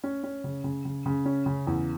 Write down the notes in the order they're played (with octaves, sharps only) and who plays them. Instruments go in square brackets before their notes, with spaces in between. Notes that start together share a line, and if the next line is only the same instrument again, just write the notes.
[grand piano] C#4
C#4
C#3
C#3
C#3
C#3
C#4
C#3
E2